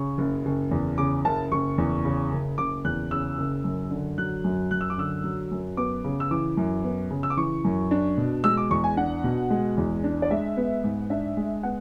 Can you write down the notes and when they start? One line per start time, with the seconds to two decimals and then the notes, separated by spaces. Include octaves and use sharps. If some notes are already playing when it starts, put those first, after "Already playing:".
Already playing: C#3 C#6
0.18 F#1
0.45 F#1
0.71 E2
0.98 C#3 D6
1.25 F#1 A5
1.52 F#1 C#6
1.78 E2
2.05 C#3
2.31 F#1
2.58 F#1 D6
2.84 E2 F#6
3.11 C#3 E6
3.38 F#1
3.64 F#2
3.91 D3
4.18 F#3 F#6
4.44 F#2
4.71 F#2 F#6
4.81 E6
4.90 D6
4.98 D3 E6
5.24 F#3
5.51 F#2
5.77 B3 D6
6.04 C#3
6.20 E6
6.31 E3 D6
6.57 F#2
6.84 B3
7.10 C#3
7.23 E6
7.30 D6
7.37 E3 C#6
7.64 F#2
7.91 D4
8.17 B2
8.44 G#3 E6
8.57 D6
8.70 E2 C#6
8.84 G#5
8.97 D4 F#5
9.24 B2
9.50 G#3
9.77 E2
10.04 D4
10.22 D5
10.31 G#3 E5
10.57 B3
10.84 G#2
11.10 D4 E5
11.37 G#3
11.63 B3 F#5